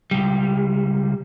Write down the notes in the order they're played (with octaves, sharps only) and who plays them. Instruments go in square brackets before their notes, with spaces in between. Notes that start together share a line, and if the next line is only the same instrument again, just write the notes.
[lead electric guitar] C#2 G3